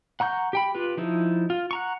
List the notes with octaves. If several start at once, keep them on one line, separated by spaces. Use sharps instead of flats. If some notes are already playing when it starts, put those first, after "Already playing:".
F#5 A#5 C#6 G6
G4 G5 B5
F4 G4 B4
F3 D#4 E4
F4
F#5 A#5 C#6